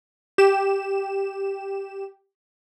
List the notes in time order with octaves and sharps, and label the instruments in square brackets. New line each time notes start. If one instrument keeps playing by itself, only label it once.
[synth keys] G4 E7